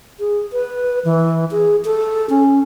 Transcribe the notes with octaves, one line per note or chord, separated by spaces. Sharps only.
G#4
B4
E3
G#4
A4
C#4